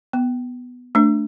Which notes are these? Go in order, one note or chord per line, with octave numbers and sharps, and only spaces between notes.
B3
A3 D4